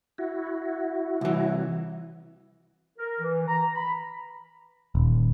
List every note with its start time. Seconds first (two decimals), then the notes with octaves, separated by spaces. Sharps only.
0.18 E4 F#4
1.21 C2 E3
2.98 A#4
3.20 E3
3.47 A#5
3.75 B5
4.95 D#1